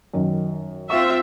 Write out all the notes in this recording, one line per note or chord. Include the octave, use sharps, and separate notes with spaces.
F#2 D#3
C4 F4 E5 C#6